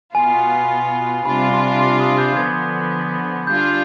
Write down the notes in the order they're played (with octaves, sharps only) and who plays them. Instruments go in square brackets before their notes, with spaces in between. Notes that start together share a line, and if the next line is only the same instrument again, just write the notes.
[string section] B2 B3 F4 [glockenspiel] G#5
[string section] C3 G3 D4 F4 [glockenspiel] B5
[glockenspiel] C6
C6
D6
D#6
G6
[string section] D3 F3 B3 [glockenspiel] G#6
[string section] G3 D4 F4 [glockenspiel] G6